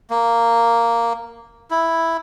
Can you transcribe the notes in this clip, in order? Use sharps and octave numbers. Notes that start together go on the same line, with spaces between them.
A#3
E4